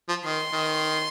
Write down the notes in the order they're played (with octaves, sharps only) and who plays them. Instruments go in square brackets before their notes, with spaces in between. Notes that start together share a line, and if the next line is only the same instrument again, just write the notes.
[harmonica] F3
[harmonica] D#3 [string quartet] C6
[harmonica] D#3